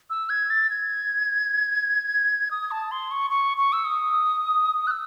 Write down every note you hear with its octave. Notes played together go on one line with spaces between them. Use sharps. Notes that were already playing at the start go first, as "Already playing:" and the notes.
E6
G#6
A6
G#6
D#6
A5
C6
C#6
C#6
C#6
E6
D#6
F#6
E6